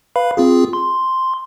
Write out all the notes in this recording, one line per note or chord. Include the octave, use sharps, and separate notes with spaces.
B4 F5 B5
C4 F4 G#4
C6